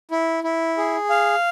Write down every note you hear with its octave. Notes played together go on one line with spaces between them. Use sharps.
E4
E4
G#4
F5